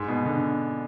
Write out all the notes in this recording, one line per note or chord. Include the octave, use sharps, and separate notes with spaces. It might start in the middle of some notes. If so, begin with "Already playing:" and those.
Already playing: G#2
B2
D3